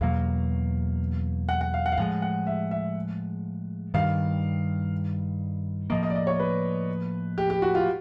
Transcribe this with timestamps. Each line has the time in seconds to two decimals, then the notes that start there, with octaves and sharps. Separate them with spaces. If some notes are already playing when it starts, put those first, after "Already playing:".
0.01 E2 B2 F#3 A#3 F5
1.49 F#5
1.61 F#5
1.74 F5
1.86 F#5
1.92 F5
1.98 A2 F3 G#3 F#5
2.22 F#5
2.47 E5
2.71 E5
3.94 G2 D#3 G3 F5
5.90 A2 F3 A#3 D#5
6.03 D#5
6.10 D5
6.15 D#5
6.27 C#5
6.40 B4
7.38 G4
7.50 G4
7.62 F#4
7.75 F4